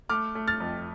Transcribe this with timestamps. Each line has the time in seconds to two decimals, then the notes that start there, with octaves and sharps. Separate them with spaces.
0.09 A3 D6 F6
0.35 A3
0.47 F6 A6
0.60 F2